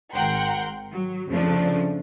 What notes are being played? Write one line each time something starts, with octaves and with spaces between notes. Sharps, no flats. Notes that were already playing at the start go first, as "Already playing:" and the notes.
G#1 A#4 F#5 G5 C6
F#3
F2 C#3 F3 A3 D4